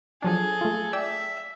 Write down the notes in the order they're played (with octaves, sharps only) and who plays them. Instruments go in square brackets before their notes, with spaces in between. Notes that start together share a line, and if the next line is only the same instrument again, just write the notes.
[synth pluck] F3 F#3 D4 [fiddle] G#4 A4
[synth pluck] A3 F4
[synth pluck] D5 G5 E6 [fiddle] E5